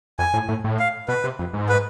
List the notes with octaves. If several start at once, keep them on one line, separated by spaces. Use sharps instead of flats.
F2 G#5
A2
A2
A2
F5
B2 B4
C3
F2
G#2
B4